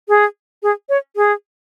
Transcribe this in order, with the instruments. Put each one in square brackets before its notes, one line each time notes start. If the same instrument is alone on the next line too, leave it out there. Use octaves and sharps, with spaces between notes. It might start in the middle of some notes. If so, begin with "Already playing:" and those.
[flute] G#4
G#4
C#5
G#4